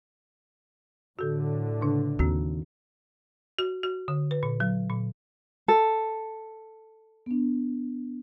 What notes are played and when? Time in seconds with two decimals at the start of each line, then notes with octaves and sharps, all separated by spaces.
1.19 A2 D3 F#4 A4
1.81 C#3 D4
2.19 D#2 C4 F#4
3.59 F#4
3.83 F#4
4.08 D3
4.31 B4
4.43 A#2
4.60 F#3
4.90 A#2
5.68 A4
7.26 B3 D4